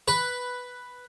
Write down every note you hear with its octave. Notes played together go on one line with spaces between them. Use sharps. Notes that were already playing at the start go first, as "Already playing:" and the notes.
B4